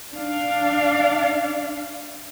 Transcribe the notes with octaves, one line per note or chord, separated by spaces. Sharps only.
D4 F5